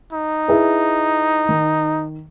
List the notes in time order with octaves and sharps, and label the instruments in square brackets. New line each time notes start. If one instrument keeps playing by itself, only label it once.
[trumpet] D#4
[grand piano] E4 G#4 B4
D#3